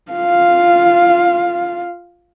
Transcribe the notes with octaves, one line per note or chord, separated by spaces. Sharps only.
F4 F5